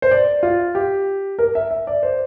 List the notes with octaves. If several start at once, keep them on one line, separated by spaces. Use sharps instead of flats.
C5
D5
F4
G4
A#4
E5
E5
D5
C5